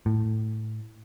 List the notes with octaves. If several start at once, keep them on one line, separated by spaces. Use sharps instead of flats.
A2